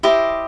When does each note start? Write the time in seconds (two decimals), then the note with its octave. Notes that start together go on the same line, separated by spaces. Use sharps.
0.03 E4 G4 C5 D#5